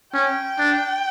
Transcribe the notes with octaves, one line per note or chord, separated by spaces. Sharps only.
C#4 G5
D4